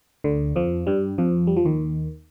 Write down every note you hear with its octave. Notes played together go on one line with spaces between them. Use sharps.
D2 D3
F2 F3
G2 G3
F2 F3
G3
F3
D#2 D#3